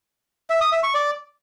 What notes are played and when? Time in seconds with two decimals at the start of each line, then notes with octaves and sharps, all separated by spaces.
0.50 E5
0.61 D#6
0.72 E5
0.83 C#6
0.94 D5